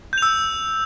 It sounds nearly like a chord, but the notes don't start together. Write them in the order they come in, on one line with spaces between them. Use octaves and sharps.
G6 F7 E6